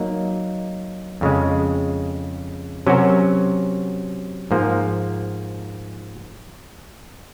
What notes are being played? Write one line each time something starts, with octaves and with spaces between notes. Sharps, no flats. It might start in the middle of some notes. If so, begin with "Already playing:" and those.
Already playing: F#3 A#3 D#4
F2 C#3 G#3
C3 F#3 C#4 F#4 A#4
G#2 F3 A#3